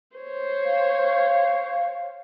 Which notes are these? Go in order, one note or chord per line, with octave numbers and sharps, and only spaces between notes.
C5 C#5
F5